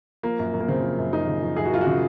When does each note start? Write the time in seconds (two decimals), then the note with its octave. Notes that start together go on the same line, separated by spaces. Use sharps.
0.23 F3 A#3
0.39 F#2
0.54 F#2
0.60 A#3
0.68 C#3 C4
0.83 F3
0.98 F#2
1.13 F#2 D#4
1.27 C#3
1.43 F3
1.57 F#2 G#4
1.65 F#4
1.72 F#2 F4
1.81 F#4
1.87 C#3